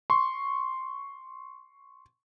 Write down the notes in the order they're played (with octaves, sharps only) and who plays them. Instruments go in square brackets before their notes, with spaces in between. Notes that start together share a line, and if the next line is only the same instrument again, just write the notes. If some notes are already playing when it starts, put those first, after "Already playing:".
[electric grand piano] C6 C#6